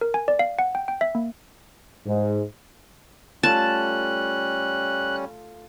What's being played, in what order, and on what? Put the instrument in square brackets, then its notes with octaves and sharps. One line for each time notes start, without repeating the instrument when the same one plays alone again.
[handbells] A#4
G#5
D5
F5
F#5
G5
G5
E5
A#3
[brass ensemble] G#2
[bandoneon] G3 C#4 [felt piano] A3 F4 A4 [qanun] A5 [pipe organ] F#6